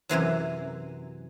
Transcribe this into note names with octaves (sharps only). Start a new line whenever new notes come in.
F#2 C3 E3 F#3